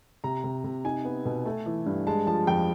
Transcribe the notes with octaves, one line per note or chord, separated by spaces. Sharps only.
C3 A#5
C3
C3
D#4 G#5
B3
B2
A3
E3
G2
G#3 A5
F3 A5
F2 G5